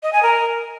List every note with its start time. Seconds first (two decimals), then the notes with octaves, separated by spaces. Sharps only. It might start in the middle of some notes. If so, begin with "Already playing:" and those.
0.03 D#5
0.13 G#5
0.23 A#4